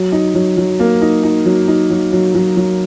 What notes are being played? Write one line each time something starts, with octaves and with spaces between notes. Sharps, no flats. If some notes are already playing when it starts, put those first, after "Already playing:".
Already playing: F#3
D#4
F#3
F#3
A#3
D#4
D#4
F#3
D#4
F#3
F#3
F#3
F#3